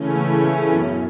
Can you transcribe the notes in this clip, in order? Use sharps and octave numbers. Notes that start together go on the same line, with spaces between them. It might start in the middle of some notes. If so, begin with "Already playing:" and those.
Already playing: C#3 E3 A3 C#4
A2
A2
F#2 B2